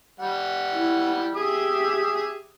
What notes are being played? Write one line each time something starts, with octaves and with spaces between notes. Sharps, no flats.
G3 F#5
E4
G4 G#4 E5 D#6